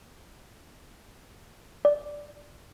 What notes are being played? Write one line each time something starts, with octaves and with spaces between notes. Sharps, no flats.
D5